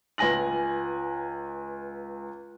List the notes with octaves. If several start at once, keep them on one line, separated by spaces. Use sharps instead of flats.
C#2 B4 G#5 A#6 F#7